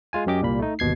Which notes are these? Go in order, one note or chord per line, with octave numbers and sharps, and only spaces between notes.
G#3 F4 G#5
F#2 F#3 C#4 G4 D#5 D6
C2 A#2 G3 A#3 B5
A3 D#4
G1 D#2 B2 G#6 C7